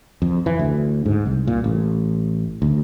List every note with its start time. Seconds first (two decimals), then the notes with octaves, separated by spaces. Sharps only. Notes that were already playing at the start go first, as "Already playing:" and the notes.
0.22 F2
0.46 E3
0.59 D2
1.06 G#2
1.26 C2
1.47 A#2
1.64 A1
2.62 D2